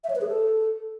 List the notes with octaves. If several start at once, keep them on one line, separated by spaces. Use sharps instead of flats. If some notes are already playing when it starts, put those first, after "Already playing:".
E5
C#5
B4
G#4
A4